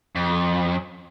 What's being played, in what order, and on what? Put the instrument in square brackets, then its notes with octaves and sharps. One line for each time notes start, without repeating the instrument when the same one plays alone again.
[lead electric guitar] F2